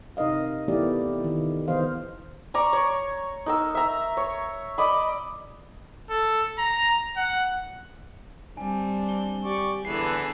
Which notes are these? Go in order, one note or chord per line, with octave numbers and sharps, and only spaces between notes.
C3 D#4 A#4 D#5 F5
E3 A3 B3 E4 G4 D5
D#3
D#3 E3 B3 C5 D#5 F5
D5 A#5 C#6
C#5
D#4 A#4 E6
E5 A#5
C#5
D5 D#5 B5
A4
A#5
F#5
G3 C4 D4 G#5
G7
G4 D5 C#6
E2 D3 E3 B3 G#4 A4 B4 C7